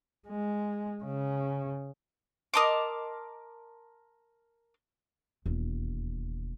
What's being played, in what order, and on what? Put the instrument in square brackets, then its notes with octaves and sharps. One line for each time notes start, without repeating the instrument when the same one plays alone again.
[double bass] G#3
C#3
[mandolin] A#4 A5 C6 [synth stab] D#5 D6
[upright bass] E1 D#2